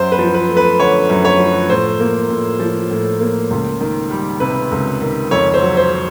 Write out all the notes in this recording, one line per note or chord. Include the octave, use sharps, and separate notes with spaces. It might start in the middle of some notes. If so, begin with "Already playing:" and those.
Already playing: F#2 C5
B4
F3
B4
A3
B4
D3 C#5
F#2
C#5
F3
A2 C5
A#3
A2
F3
A2
A#3
C#2
D#3
G3
C3 B4
C#2
D#3
F2 C#5
C5
F#3
C5